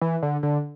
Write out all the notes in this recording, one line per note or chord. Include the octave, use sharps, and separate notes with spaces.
E3
D3
D3